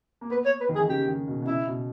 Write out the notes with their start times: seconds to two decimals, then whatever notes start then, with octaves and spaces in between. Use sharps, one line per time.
0.21 A#3
0.30 B3 B4
0.45 C#5
0.60 B4
0.69 D#3
0.75 G#4
0.81 D#3
0.89 C#3 G4
1.08 D#3
1.28 B2
1.42 B2
1.47 C#3 E4
1.67 B2